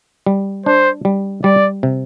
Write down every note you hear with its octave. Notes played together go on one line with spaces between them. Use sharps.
G3
D4 C5
G3
G3 D5
C3